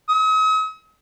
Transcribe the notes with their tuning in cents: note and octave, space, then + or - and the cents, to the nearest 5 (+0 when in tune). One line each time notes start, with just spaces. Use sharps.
D#6 +45